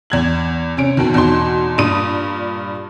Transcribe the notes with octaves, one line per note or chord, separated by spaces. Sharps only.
E2 G#6 F#7
C3 C#4 D7
F2 B2 D#3
E2 B2 D#4 C6
G2 A#2 D#6 D#7